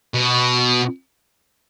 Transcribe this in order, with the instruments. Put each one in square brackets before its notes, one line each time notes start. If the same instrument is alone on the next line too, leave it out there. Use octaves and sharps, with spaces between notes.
[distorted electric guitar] B2